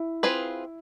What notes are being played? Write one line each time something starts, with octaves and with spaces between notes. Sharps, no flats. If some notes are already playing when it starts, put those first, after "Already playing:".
Already playing: E4
C4 F4 G#4 B4